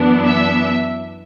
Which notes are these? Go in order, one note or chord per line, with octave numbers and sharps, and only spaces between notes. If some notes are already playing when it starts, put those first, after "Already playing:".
Already playing: F#2 E3 B3 D4
E5